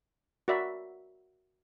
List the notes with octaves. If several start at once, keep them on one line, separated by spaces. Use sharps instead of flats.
F#4 A#4 D5 E5 B5